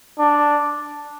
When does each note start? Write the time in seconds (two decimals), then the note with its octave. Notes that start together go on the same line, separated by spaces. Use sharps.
0.18 D4